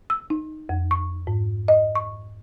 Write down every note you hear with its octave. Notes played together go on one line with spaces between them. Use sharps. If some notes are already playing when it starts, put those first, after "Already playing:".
E6
D#4
F2
C#6
G#2
D#5
C#6